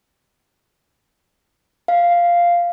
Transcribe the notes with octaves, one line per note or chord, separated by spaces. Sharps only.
F5